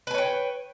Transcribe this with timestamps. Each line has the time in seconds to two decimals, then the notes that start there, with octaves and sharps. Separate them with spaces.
0.07 B4
0.11 G#5
0.14 C#5
0.18 G5